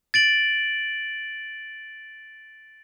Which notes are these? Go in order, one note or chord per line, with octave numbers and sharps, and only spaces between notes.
A6 D7 F#7